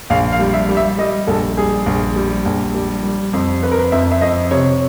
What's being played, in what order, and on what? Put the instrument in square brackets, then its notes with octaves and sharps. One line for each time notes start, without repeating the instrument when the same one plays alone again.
[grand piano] A#1 F5
F5
G3
E5
G3
E5
G3 D#5
A#1 A4
G3 G#4
A#1
G3
A#1
G3
G3
F2
F2 B4
A#4
B4
F2 E5
E5
F2 D#5
C3 C#5